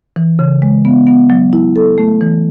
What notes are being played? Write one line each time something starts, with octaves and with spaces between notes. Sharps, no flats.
E3
C#3
G#3
B3
B3
F#3
E4
A4
A3
E3